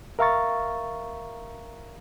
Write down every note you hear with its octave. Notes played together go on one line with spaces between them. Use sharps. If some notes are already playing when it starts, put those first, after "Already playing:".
A#4 E5 F5 A#5 C#6 A6